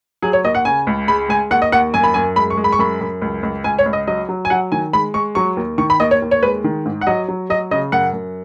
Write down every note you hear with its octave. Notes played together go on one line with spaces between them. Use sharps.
F#3 G#4
C#5
D#2 D#5
F#5
C#3 G#5
C#2
G#3 B5
G#3 G#5
D#2 F#5
D#5
D#2 F#5
F#2 G#5
B5
F#2 G#5
G#3 B5
C#6
G#3
B5
C#6
F#2 B5
F#2
C#2
C#2
C#2 G#5
C#5
C#2
D#5
F#3 D#5
F#3
G#5
F#3 F#5
D#3 G#5
G#3 B5
G#3 C#6
F#3 C#6
D#2
D#3 C#6
B5
D#2 D#5
C#5
D#2
C#5
G#3 B4
D#3
G#2
F#5
F#3 D#5
F#3
F#3 D#5
C#3 D#5
F#2 F#5
F#2